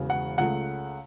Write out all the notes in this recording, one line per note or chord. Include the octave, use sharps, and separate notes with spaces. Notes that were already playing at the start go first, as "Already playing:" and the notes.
Already playing: E1 E2 C#3
F#5
C#2 C#3 A3 F#5